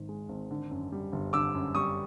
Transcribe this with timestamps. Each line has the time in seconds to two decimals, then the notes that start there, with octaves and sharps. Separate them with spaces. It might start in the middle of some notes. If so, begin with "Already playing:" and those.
Already playing: G#1 G#2 D#3
0.09 G#3
0.29 G#1
0.51 D3
0.71 F#2
0.92 G3
1.12 G1
1.33 D3 D6 E6
1.55 F#2
1.75 G3 C#6 D#6